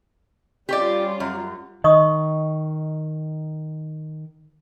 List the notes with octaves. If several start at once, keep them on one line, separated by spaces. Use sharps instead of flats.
G3 C#4 F4 G4 C#5 D5
F#2
D#3 D#5 C#6 D#6